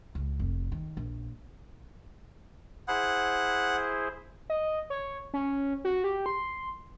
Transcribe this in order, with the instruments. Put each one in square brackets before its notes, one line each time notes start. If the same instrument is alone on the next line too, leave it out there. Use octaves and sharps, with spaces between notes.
[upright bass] C#2
F1
D#3
A#1
[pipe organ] E4 G#4 C5 [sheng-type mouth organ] F#5
[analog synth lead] D#5
C#5
C#4
F#4
G4
C6